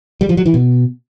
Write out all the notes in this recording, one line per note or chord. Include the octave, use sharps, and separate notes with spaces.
G3
F3
F#3
E3
B2